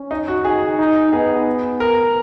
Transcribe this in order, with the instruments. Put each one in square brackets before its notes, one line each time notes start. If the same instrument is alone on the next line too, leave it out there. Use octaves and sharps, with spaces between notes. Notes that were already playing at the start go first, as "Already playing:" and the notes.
Already playing: [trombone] C#4
[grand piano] D#4
F#4
[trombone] D#4 [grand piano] G#4
[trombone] D#4
[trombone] B3 [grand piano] G#4
[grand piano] A#4